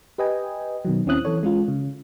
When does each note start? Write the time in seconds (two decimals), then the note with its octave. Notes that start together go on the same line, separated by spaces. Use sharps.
0.18 G4 B4 D#5 G5 G#5
0.85 B2 D#3 F#3
1.06 D#2 C4 C#4 E4 D#6 F#6
1.25 E3 A4 C#5
1.43 G#3 C#4 F4
1.68 C#3